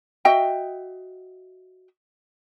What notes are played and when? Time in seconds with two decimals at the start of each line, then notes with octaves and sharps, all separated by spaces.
0.25 F#4 D#5 E5 G5